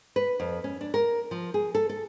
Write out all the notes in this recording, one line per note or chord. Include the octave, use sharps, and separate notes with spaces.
B4
F2
C#4
D4
A#4
F3
G#4
A4
A4